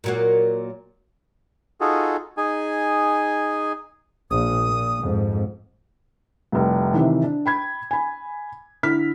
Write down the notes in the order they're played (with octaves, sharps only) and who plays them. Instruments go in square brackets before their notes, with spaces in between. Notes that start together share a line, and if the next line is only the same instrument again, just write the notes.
[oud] A#2 F#3 A#3
[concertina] D#4 F4 F#4 G#4 A4
D#4 G#4 G#5
[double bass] A#1 A#2 [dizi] D#6
[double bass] A#2
F2 G#2
[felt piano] F1 C2
C3 D#3 E3
D4
G5 B5 G#6
G#5 B5
D3 E4 F6 B6